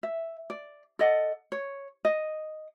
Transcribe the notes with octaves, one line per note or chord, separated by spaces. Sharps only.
E5
D5
A4 D5 D#5 F#5
C#5
D#5